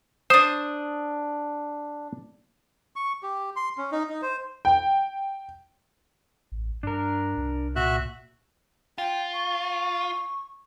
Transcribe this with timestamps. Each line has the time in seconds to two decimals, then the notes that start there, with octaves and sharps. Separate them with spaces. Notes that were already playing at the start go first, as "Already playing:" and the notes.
0.30 D4 C5 D#6
2.96 C#6
3.23 G4
3.56 C6
3.78 C#4
3.92 D#4
4.10 D#4
4.22 C5
4.65 G5
6.52 A1
6.83 G2 D4 A#4
7.37 C2
7.76 A#2 F#4 E5 F#6
8.98 F4 G5
9.34 C#6
9.60 C#6